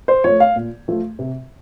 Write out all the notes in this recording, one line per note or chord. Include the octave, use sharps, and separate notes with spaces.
C5
F3 A3 C#5
F5
A#2
F3 A3
C3